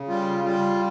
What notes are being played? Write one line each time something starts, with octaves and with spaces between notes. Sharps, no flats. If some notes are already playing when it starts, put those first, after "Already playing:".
Already playing: C#3
G3 F4
G3 F4